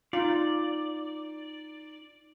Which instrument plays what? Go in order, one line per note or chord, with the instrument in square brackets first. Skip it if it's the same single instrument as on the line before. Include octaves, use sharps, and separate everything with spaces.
[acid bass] D#4 [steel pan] F4 [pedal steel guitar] D5